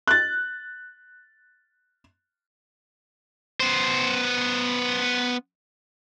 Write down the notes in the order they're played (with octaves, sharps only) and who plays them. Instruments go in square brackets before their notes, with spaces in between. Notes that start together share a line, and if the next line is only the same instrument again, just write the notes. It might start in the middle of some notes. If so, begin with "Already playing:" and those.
[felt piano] F#6 A6
[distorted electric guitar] B3 C5